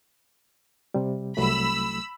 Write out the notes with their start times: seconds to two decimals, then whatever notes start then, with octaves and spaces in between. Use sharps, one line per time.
0.94 C3 G3
1.37 C2 F#3 A3 B5 E6